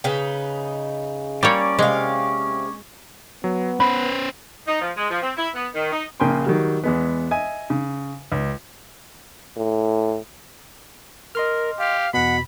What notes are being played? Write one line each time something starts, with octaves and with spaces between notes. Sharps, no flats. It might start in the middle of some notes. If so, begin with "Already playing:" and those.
C#3 D#4 B4
G3 A#3 C#4 C#5 D5
C3 G#3 F5
F#3 B3
C#4 B4 C5 B5
D#4
F3
G#3
F3
C4
E4
B3
D#3
D#4
A#1 C#3 A#3 G5 G#5 C6
D#3 F#3 G3
E2 G#3 B3
D#5 E5 G#5
C#3
C#2
A2
A#4 D#5 C6 F6
G4 F5
E2 B2 F#5 B5